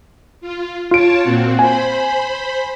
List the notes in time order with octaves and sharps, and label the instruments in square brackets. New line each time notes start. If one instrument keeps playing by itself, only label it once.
[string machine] F4
[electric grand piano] F4 D7 [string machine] C#5 A5
[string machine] A#2 C4 F#4
[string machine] C5 B5 [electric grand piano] G#5